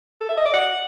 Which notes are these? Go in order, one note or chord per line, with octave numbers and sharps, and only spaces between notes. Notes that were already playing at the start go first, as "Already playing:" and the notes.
A4
E5
D#5
D5
F#5